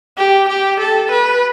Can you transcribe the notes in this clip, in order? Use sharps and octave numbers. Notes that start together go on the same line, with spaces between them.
G4
G4
A4
B4